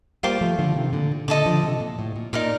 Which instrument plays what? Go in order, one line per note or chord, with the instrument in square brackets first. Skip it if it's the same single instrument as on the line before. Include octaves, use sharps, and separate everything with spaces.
[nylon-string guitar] G3 A#3 [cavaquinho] F4 C5 G5 D6
[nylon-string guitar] F3 A3
D3 F3
C3 D#3
A#2 D3
A#2
[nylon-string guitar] A#2 D3 [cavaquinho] A4 D#5 A5 D6
[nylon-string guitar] D3 F3
C3
A#2
A2
A#2
[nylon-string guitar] A#2 [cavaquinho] D#4 A#4 D5